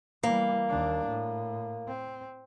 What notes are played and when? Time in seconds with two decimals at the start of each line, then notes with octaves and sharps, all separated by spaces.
0.23 E3 G3 A#3
0.69 D#2 D4
1.07 A2
1.88 C4